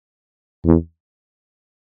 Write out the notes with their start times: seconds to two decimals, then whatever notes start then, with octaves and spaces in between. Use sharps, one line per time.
0.65 E2